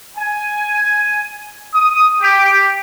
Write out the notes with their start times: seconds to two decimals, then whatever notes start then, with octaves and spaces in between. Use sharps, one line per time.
0.16 G#5
1.73 D#6
2.20 G4